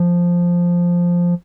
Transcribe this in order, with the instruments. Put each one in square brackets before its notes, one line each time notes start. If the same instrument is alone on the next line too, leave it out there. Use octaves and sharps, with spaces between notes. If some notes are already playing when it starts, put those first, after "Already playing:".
Already playing: [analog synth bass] F3